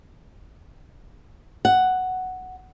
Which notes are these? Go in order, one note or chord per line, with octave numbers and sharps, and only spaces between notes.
F#5